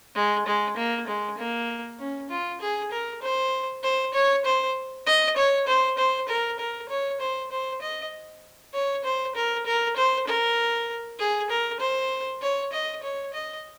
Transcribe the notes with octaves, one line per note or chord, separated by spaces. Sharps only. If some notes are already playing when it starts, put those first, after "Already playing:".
G#3
G#3
A#3
G#3
A#3
C#4
F4
G#4
A#4
C5
C5
C#5
C5
D#5
C#5
C5
C5
A#4
A#4
C#5
C5
C5
D#5
C#5
C5
A#4
A#4
C5
A#4
G#4
A#4
C5
C#5
D#5
C#5
D#5